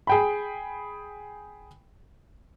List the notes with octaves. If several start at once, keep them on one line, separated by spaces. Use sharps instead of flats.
G#4 G5 B5